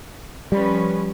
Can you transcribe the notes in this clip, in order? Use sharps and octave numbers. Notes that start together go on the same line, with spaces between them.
F3 G3 C#4 B4